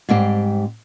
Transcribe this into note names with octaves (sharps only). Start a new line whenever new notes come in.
G#2 G3 C4 G4